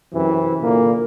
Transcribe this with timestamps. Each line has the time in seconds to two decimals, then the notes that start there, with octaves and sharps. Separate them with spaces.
0.13 F#2 C3 E3
0.61 A#2 D3 A#3